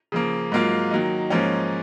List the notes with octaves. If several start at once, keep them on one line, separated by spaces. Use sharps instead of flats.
C#3 F3 A#3
G#2 F#3 A#3 F4
D#3 F#3 A#3 D#4
G#2 F3 A#3 C#4